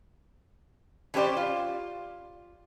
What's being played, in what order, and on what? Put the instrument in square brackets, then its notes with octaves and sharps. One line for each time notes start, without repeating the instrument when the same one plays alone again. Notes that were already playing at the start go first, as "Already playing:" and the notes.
[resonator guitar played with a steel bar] E3 C#4 G4 C5 D5
F4